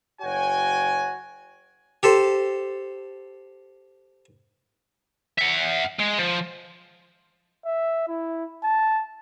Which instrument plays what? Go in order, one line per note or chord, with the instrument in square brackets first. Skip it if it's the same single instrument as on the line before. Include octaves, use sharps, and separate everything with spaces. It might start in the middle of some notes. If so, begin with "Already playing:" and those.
[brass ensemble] F#1 F#4 C#5 G5 G#5
[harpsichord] G4 A4 C5
[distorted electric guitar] E5 F#5
G#3
F3
[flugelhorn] E5
E4
A5